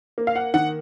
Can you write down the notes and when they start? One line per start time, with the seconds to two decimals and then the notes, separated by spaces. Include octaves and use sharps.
0.18 A#3
0.27 F5
0.36 F#5
0.54 D#3 F#5